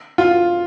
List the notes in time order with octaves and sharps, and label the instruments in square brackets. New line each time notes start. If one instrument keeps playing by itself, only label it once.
[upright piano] F4